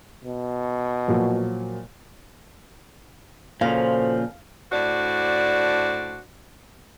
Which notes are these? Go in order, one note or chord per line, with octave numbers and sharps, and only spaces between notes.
B2
A#2 F3 F#3
A#2 C#3 F3 F#4 A4 C5 F5
A2 D4 F#4 C5 D5